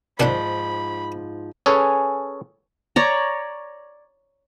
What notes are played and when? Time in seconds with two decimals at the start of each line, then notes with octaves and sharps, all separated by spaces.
0.20 G#2 D#3 F3 D4 F#5 B5
1.66 C#4 G#4 A4 B4 C#5
2.96 C#5 D5 A#5